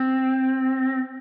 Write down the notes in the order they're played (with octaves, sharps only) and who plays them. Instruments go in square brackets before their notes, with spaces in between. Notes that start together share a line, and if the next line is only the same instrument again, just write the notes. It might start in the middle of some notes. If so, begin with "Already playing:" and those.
Already playing: [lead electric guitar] C4